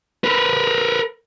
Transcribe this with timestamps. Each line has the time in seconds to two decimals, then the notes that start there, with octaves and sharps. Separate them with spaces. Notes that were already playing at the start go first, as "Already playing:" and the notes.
0.24 A#4 B4